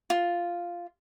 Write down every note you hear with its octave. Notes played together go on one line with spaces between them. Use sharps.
F4